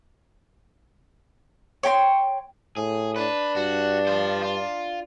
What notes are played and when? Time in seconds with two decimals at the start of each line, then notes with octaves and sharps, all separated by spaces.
1.83 C#5 G5 A#5 C6
2.77 A2 G#4
3.16 D4 B4
3.56 G2 F#4
4.07 F4 C5
4.42 F4